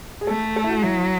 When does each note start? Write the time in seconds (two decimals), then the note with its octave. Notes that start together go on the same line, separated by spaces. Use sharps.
0.21 G#4
0.27 A3 A4
0.56 A4
0.64 E4
0.69 F#4
0.83 F#3 E4